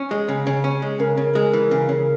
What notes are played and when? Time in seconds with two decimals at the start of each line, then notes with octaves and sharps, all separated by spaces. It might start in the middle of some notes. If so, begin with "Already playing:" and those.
Already playing: C#4
0.11 G#3
0.28 C#3
0.47 C#3
0.64 C#4
0.82 G#3
1.00 C#3 A#4
1.17 C#3
1.35 G#3
1.53 E3
1.71 C#3
1.89 C#3